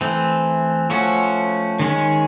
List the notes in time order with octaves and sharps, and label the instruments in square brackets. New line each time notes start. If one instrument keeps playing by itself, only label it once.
[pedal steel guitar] E3 A3 C4
F3 A3 C#4 F#4
D#3 G#3 C#4